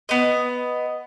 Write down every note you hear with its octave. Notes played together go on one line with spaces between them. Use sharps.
B3 D#5